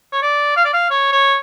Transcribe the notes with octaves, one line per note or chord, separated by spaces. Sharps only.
C#5
D5
F5
D5
F5
C#5
C#5